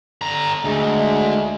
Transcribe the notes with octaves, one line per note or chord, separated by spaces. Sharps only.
D3 A#5
D2 G#3